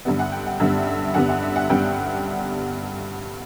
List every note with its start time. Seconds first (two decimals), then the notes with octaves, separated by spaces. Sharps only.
0.05 G2 D3 G3 B3 E5
0.19 F#5
0.32 G5
0.46 F#5
0.59 G2 D3 G3 B3 E5
0.87 E5
1.14 G2 D3 G3 B3 F#5
1.28 F#5
1.42 E5
1.56 F#5
1.70 G2 D3 G3 B3 G5